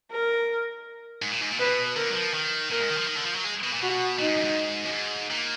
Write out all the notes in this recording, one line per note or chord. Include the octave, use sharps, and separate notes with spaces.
A#4
G#2
A#2
G#2
A#2
B2 B4
D3 A#4
F#3
F3
D#3
A#2 A#4
G#2
D#3
F3
D#3
D3
F3
F#3
G#3
B2
A#2
B2 F#4
A#2 D#4
G#2
F#2
G#2
F#2
G#2
A#2